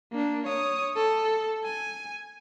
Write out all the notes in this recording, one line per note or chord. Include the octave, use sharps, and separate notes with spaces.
A#3 D4
C#5 D#6
A4
G#5